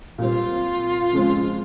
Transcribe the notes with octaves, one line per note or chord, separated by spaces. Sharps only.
A#2 G3 C4 F4
C#3 F3 G#3 C4